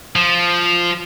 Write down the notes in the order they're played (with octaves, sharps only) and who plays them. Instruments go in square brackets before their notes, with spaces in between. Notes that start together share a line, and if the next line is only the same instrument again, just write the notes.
[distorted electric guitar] F3